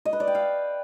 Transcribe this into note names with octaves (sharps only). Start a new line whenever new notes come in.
D#5
B4
D5
G5
F5